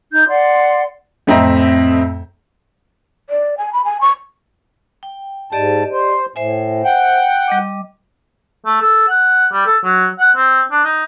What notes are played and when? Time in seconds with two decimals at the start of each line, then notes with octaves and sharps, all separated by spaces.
0.11 D#4 G6
0.27 D5 F#5 C6
1.27 F2 A2 C4 D#5 E5 A#5
3.30 D5
3.58 G#5
3.73 B5
3.85 G#5
4.01 C#6
5.03 G5
5.52 G#2 G4 D5 D#5 A5
5.92 C5
6.36 A2 C5 E5 G#5
6.84 F#5 G5
7.48 G3 D#5 D6
8.66 A3
8.82 A4
9.08 F#5
9.52 G3
9.66 A4
9.84 F#3
10.19 F#5
10.36 C4
10.71 D4
10.84 D#4